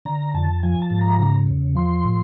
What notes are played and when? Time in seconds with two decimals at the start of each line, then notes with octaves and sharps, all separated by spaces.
0.05 D3 A#5
0.34 F2 A5
0.63 F3 G#5
0.82 A5
0.90 G#2
1.01 A#5
1.19 C#3 A#5
1.47 E2
1.75 F3 C6
2.04 A2